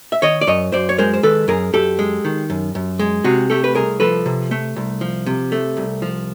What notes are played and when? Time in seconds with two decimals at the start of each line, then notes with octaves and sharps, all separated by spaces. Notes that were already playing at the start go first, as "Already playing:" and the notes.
0.12 E5
0.22 D#3 C#5 D#5
0.41 D5
0.47 F#2 C#5 D#5
0.72 F#2 C5 D5
0.89 C#5
0.98 G#3 A#4 C5
1.14 C5
1.23 D#3 A4 B4
1.48 F#2 G#4 A#4
1.73 F#2 G4 A4
1.99 G#3
2.25 D#3
2.50 F#2
2.75 F#2
2.99 G#3
3.24 C3 F#4 G#4
3.50 A3 G4 A4
3.64 B4
3.75 C2 G#4 A#4
4.00 F3 A4 B4
4.26 C3
4.51 A3
4.76 C2
5.01 F3
5.26 C3
5.52 A3
5.77 C2
6.02 F3